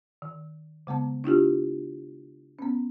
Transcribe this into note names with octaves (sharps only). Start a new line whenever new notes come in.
D#3
C#3 G#3 B3 A5
D4 E4 F4 G4
B3 C#4